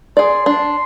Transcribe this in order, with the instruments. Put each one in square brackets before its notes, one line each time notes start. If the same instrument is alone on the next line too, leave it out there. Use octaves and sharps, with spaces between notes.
[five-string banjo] G#4 D5 [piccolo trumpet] C6
[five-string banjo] D4 [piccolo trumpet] C6